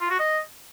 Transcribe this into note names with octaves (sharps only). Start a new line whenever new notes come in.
F4
F#4
D#5